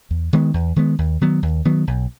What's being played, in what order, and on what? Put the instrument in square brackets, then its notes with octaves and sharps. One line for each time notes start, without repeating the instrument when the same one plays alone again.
[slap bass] E2
D#3 G#3 B3
E2
D#3 G#3 B3
D#2
D#3 F#3 B3
D#2
D#3 F#3 B3
B1